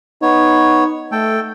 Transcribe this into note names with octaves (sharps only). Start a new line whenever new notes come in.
B3 D#4 C#5
A3 A4 G5